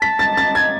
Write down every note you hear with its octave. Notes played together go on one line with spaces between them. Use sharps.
A5 B6
A6
A6
G#6